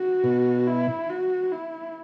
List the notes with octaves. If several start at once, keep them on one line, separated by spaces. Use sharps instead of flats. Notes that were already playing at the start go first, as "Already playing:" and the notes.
Already playing: F#4
B2
E4
F#4
E4